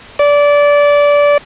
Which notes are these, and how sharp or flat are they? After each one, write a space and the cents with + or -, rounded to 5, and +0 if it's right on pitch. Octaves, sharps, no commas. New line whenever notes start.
D5 -20